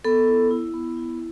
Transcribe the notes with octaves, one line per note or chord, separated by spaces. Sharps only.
B3 A4
E4
E4
B3
E4